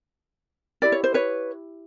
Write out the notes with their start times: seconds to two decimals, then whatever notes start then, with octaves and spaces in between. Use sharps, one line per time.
0.82 E4 G4 A#4 D5
0.92 C#5
1.04 C5
1.14 B4 C#5